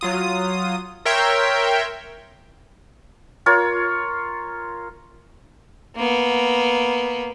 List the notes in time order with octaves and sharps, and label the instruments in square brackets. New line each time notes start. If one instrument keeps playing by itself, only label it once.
[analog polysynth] F#3 F4 D#6
A#4 C#5 E5 G5 C6
[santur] F4 A#4 C#5
[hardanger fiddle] A#3 B3